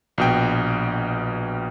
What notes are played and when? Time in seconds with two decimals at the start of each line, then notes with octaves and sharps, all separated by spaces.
0.18 A#1 B2 G5